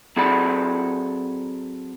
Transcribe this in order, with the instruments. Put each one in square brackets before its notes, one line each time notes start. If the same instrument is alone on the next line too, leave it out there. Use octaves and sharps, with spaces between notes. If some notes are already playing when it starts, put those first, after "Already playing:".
[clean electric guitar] F#3 C4 G#4 A4 D5 B5